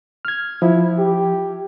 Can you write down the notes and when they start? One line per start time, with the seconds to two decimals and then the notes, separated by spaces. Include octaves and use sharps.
0.25 F6 G#6
0.62 F3 E4
0.98 G4